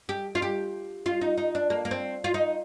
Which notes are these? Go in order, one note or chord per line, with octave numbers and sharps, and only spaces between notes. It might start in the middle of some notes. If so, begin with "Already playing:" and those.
G4
F4
G4
F4
D#4
D#4
D4
A#3
A#3
C4
F4
D#4